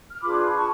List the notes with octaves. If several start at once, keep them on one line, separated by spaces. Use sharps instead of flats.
F6
D4 F4 G#4 B4 B5 D6
A5 C#6